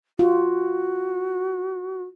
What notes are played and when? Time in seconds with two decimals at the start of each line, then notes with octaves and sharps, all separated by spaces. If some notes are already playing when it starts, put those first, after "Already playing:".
0.19 F4 F#4